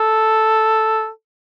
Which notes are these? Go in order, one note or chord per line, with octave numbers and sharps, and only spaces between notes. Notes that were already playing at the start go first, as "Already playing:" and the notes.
Already playing: A4